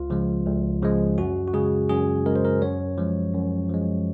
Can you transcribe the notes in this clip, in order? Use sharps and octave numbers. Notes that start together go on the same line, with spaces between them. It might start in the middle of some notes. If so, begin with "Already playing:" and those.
Already playing: C#2 F4
C#3 F3 G#3
C#2
C#3 F3 G#3
F#2 F#4
F#4
C#3 G#3 G#4
F#2 G#4
C#3 G#3 A#4
C5
A#4
F#2 C#5
F3 G#3
F#2
F3 G#3